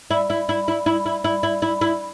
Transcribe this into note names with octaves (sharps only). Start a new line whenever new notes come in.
E4
E4
E4
E4
E4
E4
E4
E4
E4
E4